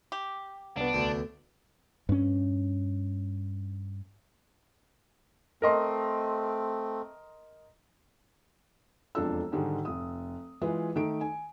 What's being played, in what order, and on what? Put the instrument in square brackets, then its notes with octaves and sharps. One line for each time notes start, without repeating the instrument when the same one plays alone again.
[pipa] G4
[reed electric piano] C2 B3 [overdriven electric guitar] D4
[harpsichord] D2 D3
[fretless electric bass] G2 C#4
[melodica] A3 C4 [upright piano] A#4 D#5 C6
[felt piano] E1 F2 D4 F4 A4 E6
G#2 D3 D#3 G3 G#3
F1 D#6
E3 G#3 F4 G#4 B4
D#3 A3 D7
G#5